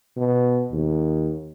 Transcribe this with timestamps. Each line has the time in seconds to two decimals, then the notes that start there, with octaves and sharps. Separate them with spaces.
0.17 B2
0.72 D#2